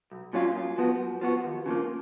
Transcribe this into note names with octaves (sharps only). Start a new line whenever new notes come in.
B1
A#2 F#3 C#4 F4
F#2
F3 B3 F#4
F#2
F3 B3 F#4
D#2
C#3 F3 A#3